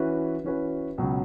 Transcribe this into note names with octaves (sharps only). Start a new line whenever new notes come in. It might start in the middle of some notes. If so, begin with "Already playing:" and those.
Already playing: E3 C#4 F#4 B4
E3 C#4 F#4 B4
C#2 B2 F#3 C#4